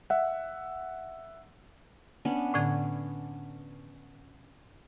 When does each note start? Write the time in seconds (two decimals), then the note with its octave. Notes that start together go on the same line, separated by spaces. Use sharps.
0.10 E5 F#5
2.25 B3 C#4 D4
2.54 A2 D3 G#6